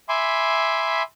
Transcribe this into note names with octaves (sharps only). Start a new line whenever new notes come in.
E5 G#5 B5 C6 D6